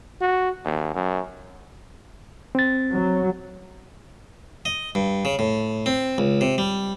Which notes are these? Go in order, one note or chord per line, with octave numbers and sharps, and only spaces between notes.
F#4
D#2
F#2
C4 A6
F#3
D#5
G2
C#3
A2
C4
C#2
C3
G3